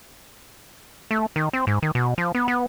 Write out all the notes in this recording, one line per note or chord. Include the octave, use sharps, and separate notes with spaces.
A3
D#3
C4
G#2
D#3
B2
F3
B3
B3